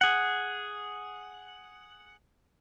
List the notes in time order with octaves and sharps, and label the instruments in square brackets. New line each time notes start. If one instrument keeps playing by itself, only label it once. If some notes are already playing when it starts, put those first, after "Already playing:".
[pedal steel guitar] G#4 F#5